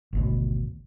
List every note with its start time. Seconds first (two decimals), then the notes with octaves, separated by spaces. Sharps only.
0.13 G#1 D2 B2